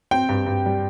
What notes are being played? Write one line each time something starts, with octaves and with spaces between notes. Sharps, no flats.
C4 G5
G2
G2
G3